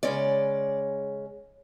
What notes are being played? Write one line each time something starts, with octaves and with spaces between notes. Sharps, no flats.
C#3 G#3 C#4 D5